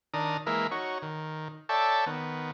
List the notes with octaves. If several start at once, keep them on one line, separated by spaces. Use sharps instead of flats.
D#3 D4 A#5 D#6
E3 G#3 A#3 A#4 E5
D#4 F#4 C#5
D#3
A4 C#5 D5 E5 G5 A5
D#3 B3